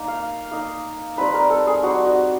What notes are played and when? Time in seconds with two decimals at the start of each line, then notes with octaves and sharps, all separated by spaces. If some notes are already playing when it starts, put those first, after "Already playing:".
Already playing: A#3 D#4
0.08 F5
0.51 A#3 D#4
1.17 G3 C4 D#4 B4
1.34 A#4
1.50 A4
1.67 G#4
1.83 G3 C4 D#4 F#4
2.05 F#4